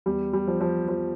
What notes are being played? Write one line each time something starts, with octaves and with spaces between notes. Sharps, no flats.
E2 G3
G3
F3
F3
F3